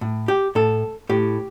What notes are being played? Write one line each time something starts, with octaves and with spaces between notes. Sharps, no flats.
A2
G4
A2 A4
A2 G4